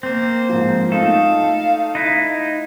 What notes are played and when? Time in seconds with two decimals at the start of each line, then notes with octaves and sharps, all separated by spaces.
0.03 A#3 C4 C5
0.49 G#2 F3
0.92 A3 D#4 F4 A4 F5
1.95 D#4 E4 F#6